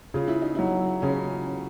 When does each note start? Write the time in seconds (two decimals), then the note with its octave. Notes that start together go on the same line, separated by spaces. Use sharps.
0.14 C#3 F4
0.28 E4
0.42 D#4
0.55 F#3 E4
1.02 C#3 C#4